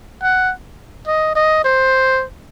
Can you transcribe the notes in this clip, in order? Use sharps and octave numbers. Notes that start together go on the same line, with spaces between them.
F#5
D#5
D#5
C5